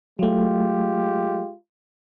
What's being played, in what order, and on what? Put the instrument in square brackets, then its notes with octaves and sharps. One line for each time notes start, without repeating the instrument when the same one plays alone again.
[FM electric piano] F#3 A3 [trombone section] G#3 F4 G4